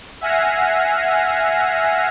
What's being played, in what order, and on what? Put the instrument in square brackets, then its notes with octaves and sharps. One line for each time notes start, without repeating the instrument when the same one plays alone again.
[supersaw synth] E5 F#5 G#5 F6 A#6 C7